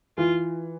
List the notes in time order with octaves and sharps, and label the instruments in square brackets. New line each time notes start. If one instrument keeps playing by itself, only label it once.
[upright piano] E3 [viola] F4